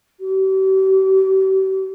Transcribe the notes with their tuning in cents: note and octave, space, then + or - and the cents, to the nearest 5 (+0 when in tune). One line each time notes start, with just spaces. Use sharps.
G4 -45